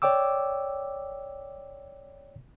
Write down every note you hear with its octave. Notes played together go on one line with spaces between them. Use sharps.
C#5 D5 G5 D6 E6